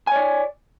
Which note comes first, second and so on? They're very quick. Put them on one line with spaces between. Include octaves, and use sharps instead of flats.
G#5 C#5 D5